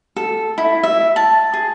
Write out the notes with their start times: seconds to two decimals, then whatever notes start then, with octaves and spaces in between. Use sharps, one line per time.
0.16 A4
0.58 E4
0.83 E5
1.16 A5
1.54 G#4